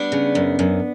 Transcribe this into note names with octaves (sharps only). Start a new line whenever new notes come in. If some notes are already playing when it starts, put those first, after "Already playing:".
Already playing: G3 B3 D4
C#3
F#2
F#2